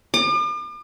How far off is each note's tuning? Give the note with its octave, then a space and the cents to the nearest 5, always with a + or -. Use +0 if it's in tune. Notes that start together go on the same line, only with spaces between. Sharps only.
D6 +45